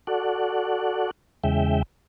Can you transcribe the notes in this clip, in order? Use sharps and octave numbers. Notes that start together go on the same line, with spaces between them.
F#4 A4 D5 F#5
E2 C#3 G#3 E5 G5